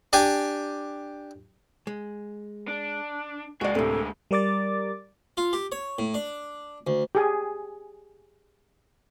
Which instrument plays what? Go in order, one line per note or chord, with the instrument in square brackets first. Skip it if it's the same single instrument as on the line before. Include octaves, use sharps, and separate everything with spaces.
[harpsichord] D4 G4 G#5
[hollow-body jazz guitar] G#3
[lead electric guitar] D4
[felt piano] C#2 D5 [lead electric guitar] G#3 A#3 [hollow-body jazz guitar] F#4
[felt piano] D2 [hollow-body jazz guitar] A2 C3 [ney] A4
[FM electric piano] G3 A#4 D5 D6 A6
[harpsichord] F4
G4
C#5
A2
D4
D2
[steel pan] G4 G#4 G#5